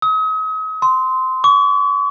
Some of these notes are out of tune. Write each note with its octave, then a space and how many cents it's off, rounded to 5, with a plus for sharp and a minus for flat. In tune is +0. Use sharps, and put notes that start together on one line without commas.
D#6 +40
C6 -15
C#6 +40